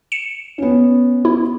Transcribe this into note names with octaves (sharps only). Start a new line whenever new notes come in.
C#7 E7
B3 C#4
E4